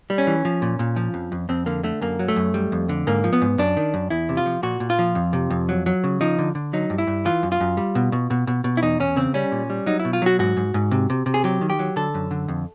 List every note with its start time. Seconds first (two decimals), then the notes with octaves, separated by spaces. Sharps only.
0.10 G3
0.18 C#4
0.27 E3
0.45 F3
0.62 A#2
0.79 A#2
0.96 F3
1.14 F2
1.32 F2
1.49 F2 C4
1.66 D3 A#3
1.83 D3 A3
2.01 F#2 A#3
2.19 F#3
2.28 A3
2.36 F#2
2.54 G3
2.72 F2
2.89 D3
3.07 G#2 A#3
3.24 F3
3.33 B3
3.42 G#2
3.58 F#2 D4
3.77 D#3
3.94 F#2
4.10 E2 E4
4.29 C3
4.37 F4
4.46 F3
4.63 A#2 F#4
4.80 A#2
4.90 F4
4.99 F3
5.15 F2
5.33 C3
5.50 F2
5.69 F#3
5.86 F#3
6.04 C#3
6.21 F3 D#4
6.39 D3
6.55 D3
6.73 F#3 D#4
6.90 G2
6.98 E4
7.07 G2
7.25 E3 F4
7.43 F#2
7.52 F4
7.60 F#2
7.77 G3
7.95 B2
8.12 B2
8.31 B2
8.47 B2
8.64 B2
8.77 E4
8.82 E2 D#4
9.00 E2 C#4
9.16 C#3 C4
9.34 G3 C#4
9.52 A#2
9.70 G3
9.86 F#3 D#4
10.00 E4
10.05 B2
10.13 F4
10.22 F#3 F#4
10.39 G#2 F#4
10.57 G#2
10.74 G#2
10.91 C3
11.10 C3
11.26 C3
11.34 G#4
11.44 F#3 G4
11.61 D#3
11.70 G4
11.79 F#3
11.96 D3 A4
12.14 F#2
12.31 D3
12.48 F2